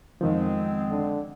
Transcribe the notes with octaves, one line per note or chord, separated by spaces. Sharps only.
F2 D#3 F3 G#3 B3 C4
D3